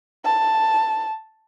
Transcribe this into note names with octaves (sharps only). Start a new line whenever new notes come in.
A5